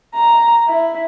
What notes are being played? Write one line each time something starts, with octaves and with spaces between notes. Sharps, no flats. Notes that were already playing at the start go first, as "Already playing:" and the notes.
A#5
E4